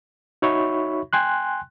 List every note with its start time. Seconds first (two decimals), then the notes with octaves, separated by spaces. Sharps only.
0.42 D#4 F#4 C#5 E5 B5 C#6
1.13 G5 G#5 C6 F#6